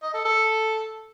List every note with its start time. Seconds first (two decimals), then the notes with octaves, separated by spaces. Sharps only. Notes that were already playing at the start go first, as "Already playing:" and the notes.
0.03 D#5
0.14 A4
0.25 A4